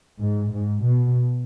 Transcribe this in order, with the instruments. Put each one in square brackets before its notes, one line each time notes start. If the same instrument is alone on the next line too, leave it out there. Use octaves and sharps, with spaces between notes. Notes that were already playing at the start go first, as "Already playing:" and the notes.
[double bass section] G#2
G#2
B2